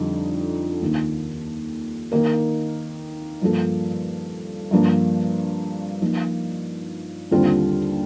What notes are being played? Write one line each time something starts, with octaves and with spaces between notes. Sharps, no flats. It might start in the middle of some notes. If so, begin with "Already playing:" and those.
Already playing: F2 D3 G3 D#4
D#2 D#3 A#3
D#3 A#3 D#4 A#4
G2 F3 A#3 F4 A4
G2 F3 A#3 D4
F3 A#3 D#4
D#2 D3 G3 C4 F4